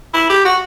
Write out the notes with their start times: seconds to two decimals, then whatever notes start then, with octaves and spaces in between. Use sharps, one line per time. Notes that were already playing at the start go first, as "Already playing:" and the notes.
0.14 E4
0.30 G4
0.45 F#4